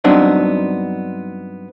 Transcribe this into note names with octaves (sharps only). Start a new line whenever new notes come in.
G2 F#3 B3 C4 D4 D#4